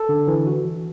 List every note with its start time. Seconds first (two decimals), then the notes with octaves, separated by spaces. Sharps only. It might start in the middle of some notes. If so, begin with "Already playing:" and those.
Already playing: A4
0.09 D3
0.28 E3
0.47 F#4
0.65 E3